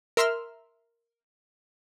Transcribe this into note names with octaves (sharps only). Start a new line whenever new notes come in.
A#4 E5 C6 E6 F6